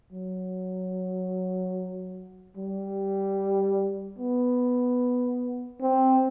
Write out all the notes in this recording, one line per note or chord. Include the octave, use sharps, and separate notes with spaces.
F#3
G3
B3
C4